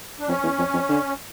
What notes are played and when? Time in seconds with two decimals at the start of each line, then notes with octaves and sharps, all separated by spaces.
0.19 D4
0.28 F2 C#4
0.43 E2
0.59 F2
0.74 F2
0.89 D3